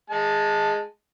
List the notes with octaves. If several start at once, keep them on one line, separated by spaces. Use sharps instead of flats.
G#3 A5